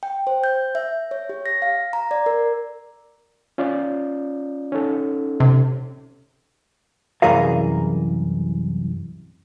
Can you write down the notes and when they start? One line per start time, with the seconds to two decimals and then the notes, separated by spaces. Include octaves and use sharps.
0.03 G5
0.27 C5
0.44 G6
0.75 E5
1.11 C#5
1.29 G4
1.46 A#6
1.62 F5
1.93 A#5
2.11 D5
2.26 A#4
3.58 C#4 F4 D5
4.72 C#4 D#4 A4
5.40 C3
7.22 C2 F#2 E3 G#4 A#4 F5